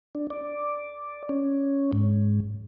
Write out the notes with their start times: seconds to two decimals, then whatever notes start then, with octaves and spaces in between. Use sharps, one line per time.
0.15 D4
0.30 D5
1.29 C#4
1.93 G#2